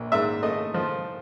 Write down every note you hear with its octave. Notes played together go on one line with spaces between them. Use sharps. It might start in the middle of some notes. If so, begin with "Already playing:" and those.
Already playing: A#1
G#2 E5
A3 D#5
F3